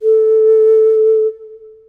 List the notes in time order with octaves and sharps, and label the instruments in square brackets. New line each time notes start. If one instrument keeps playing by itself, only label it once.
[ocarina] A4